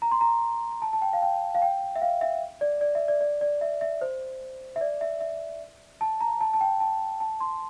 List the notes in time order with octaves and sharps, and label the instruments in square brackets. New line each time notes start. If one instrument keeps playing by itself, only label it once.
[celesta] A#5
C6
A#5
A5
A5
G5
F5
G5
F5
G5
E5
F5
E5
D5
D5
E5
D5
D5
D5
E5
E5
C5
E5
D5
E5
E5
A5
A#5
A5
A5
G5
A5
A5
C6